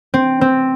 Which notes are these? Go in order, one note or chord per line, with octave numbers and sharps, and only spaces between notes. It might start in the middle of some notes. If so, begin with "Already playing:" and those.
C4
C4